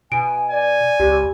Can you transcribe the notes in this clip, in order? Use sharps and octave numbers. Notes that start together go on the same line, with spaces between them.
B2 G#5 D7
D5 G#5
C#2 G4